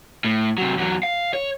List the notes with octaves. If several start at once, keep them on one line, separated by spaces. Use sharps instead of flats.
A2
C3 F#3
E2 F#3
F5
C#5